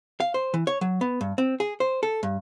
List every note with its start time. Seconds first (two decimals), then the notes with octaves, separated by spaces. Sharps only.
0.20 F5
0.34 C5
0.54 E3
0.67 C#5
0.81 F#3
1.01 B3
1.21 G2
1.38 C4
1.60 G#4
1.80 C5
2.03 A4
2.23 G2